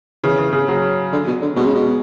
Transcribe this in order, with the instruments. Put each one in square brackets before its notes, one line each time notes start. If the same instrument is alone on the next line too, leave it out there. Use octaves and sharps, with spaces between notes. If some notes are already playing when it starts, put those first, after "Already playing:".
[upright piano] C#3 [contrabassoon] E3
[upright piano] C#3
C#3
F#3
[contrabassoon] D3
B2
D3
[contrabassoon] B2 [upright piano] G#3
[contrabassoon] C#3
B2